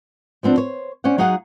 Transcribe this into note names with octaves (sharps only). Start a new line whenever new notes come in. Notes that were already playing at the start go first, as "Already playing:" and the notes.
F3 B3 C4 D4
C5 C#5
C#4 C5 D5 F#5
F#3 D#4 G#4 F5 F#5